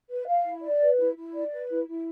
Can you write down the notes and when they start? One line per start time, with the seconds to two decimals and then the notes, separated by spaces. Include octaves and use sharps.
0.09 B4
0.27 F5
0.44 E4
0.62 D5
0.81 B4
0.98 E4
1.16 E4
1.34 D5
1.52 B4
1.69 E4
1.87 E4